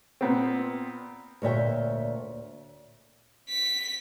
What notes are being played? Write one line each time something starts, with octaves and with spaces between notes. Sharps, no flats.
A#2 B3 C4
D2 A#2 C#5 E5 G5
B6